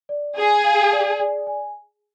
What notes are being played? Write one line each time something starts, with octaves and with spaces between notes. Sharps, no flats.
D5
G#4 G#5
F5
D5
D5
G#5